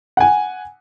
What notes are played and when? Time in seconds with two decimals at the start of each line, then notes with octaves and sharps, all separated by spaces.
0.17 F#5 G#5